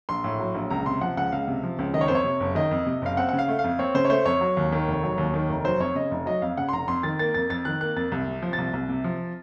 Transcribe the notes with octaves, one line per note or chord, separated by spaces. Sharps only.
A#1 C6
A2
F#3
A#1
C#2 A#5
C3 C6
F3 F#5
C#2 F#5
C#2 F5
C3
F3
C#2
D#3 D#5
C#5
F2 C5
C#5
C3
F#1
D#3 D#5
F2
C3
F#1 F5
C4 F#5
F#5
C#3
F5
A3
F5
F2
C4 C#5
C#3 C5
C#5
A3 C5
F2 C#5
F#3
D#2
D#3
F1
F#3
D#2
D#3
F1
F#3 C5
F2 C#5
C#3 D#5
F1
F#3 D#5
F2 F5
C#3 F#5
C6
F1 A#5
F2 C6
D#3 A6
A#3 A6
F2 A6
F2 A6
D#3 F#6
A#3 F#6
F2 A6
C2
C3
F3
A6
C2
C2
C3
F3